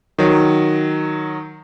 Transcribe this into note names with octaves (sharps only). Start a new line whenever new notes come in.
D#3 F#3